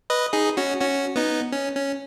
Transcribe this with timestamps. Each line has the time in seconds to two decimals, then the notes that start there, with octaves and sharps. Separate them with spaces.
0.10 B4 D#5
0.33 D#4 G#4
0.57 C#4 F#4
0.81 C#4 F#4
1.16 B3 D#4
1.52 C#4
1.76 C#4